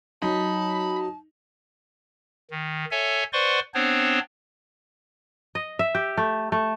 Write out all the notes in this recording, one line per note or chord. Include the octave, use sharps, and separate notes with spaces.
F#3 D#4 A5 B5
D#3
A4 C#5 E5 G#5
B4 C5 D5 F#5 C6 C#6
B3 C4 D4 C5 C#5
D#5
E5
G4
A3
A3